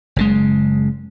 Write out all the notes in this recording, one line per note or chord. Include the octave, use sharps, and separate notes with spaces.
F#1 C#3 G#3